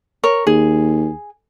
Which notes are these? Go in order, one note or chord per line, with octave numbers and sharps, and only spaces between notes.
A#4 C#5
D#2 G#4